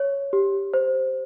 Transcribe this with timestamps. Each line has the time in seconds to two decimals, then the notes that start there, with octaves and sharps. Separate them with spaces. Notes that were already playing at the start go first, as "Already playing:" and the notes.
Already playing: C#5
0.33 G4
0.74 C5